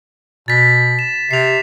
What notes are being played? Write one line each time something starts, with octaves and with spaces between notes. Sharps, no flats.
B2 A6 B6
E7
C3 C7 F7